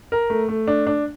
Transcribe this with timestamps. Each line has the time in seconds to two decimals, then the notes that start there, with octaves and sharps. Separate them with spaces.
0.12 A#4
0.30 A3
0.49 A3
0.67 D4
0.87 D4